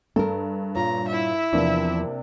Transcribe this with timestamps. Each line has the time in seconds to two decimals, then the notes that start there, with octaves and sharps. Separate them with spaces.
0.16 G2 A4 A#4
0.76 A#2 F4 C#5 A#5
1.08 E4 E5
1.53 E2 C3 F3 A#3 D4